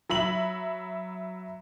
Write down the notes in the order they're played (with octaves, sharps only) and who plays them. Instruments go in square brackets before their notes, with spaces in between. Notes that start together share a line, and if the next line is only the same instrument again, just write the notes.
[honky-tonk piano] F#3 E5 B5 F#7